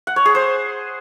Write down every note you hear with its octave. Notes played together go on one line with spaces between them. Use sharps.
F#5
C#5
G#4
C5